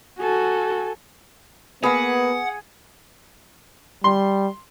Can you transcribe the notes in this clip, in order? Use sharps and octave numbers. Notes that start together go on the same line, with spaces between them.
F#4 A4 G#5
A#3 B3 G#4 B4 F#5
G3 C6